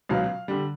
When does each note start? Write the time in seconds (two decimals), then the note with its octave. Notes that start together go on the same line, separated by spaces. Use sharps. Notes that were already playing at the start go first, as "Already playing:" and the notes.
0.09 C#2 B2 F#3 F5
0.48 D3 G3